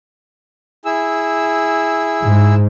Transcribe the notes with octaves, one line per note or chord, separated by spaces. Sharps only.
E4 G#4 E6
G#2